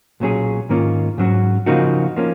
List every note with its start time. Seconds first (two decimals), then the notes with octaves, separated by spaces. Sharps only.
0.20 B1 A#2 F#3 C#4 G#4
0.69 G#2 D#3 A#3 C#4 F4
1.18 G#2 F#3 C#4 F#4
1.66 C#3 F3 A#3 D#4 F#4
2.16 F3 A#3 C#4